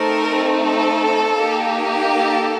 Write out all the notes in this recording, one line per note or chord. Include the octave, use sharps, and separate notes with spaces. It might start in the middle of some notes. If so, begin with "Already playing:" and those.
Already playing: A3 C4 D#4 A4 A#4
A4
A#3 D#4 G4
A4